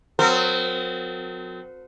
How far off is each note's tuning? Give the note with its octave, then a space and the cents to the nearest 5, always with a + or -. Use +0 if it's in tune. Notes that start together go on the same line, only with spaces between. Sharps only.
F#3 -30 C4 -30 A#4 -40